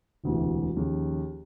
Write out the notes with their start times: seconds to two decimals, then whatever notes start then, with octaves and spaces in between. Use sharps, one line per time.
0.24 E1 D2 C3 E3
0.76 D#2 C#3 F3